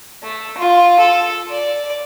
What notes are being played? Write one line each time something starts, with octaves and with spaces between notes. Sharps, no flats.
A3
F4
A4
D5